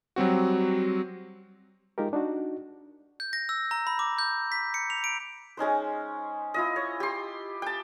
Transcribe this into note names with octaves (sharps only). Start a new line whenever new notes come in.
F#3 G3 C4 F#4
G#3 D#4 F4 G4 A#4
D4 D#4 F#4
G6
A#6
E6
A#5
B5
D6
G6
B6
C#7
F7
D7
G#3 C#4 D#4 C5
E4 F4 D#5
C#5
G4 C6
G5 A5